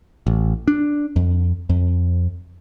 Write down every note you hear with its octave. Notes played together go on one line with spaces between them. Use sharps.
A1
D4
F2
F2